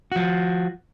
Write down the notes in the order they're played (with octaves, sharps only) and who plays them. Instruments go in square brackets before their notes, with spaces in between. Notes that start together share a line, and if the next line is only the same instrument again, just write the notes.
[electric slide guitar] F3 F#4